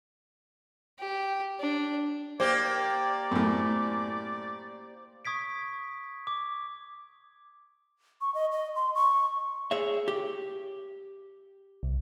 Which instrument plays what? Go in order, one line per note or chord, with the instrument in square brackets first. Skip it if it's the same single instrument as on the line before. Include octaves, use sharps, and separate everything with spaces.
[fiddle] G4
D4
[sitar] A#3 G4 [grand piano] C5 [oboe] D5
[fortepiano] F#2 A2
[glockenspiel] C#6 D#6 G#6 B6 D7
B6
D6
[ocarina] C#6
D#5
D#5
C6
C#6
[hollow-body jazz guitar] G#4 C#5 E5
G4
[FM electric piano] C2